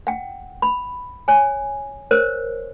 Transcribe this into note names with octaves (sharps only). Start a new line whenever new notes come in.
F#5 G5
B5
C#5 G#5
A#4 C5 C#5